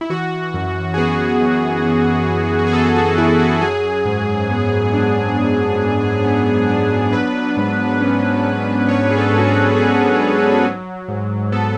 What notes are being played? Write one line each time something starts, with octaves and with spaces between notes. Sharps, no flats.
E4
E3 F#4
F#2
G#4
B3 F#4
F#2
E3
F#2
F#4
G#4
B3 A4
F#4
F#2 E4
F#4
F#3 G#4
G#2
B3
D4
F#3
G#2
B3
D4
F#3 B4
G#2
C#4
G#2
F#3 C#5
G#4
A4
G#2
F#4
G#4
C#4 G#4
G#2
F#3
G#2
B3 A4